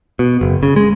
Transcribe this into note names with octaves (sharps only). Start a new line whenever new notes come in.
B2
F#1
C#3
G#3